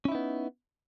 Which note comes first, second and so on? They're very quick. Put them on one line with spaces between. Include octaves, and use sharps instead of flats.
C#4 E4 D#4 B3